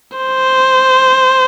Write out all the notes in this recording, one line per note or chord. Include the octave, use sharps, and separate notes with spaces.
C5